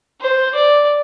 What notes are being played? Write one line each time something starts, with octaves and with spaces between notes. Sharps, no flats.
C5
D5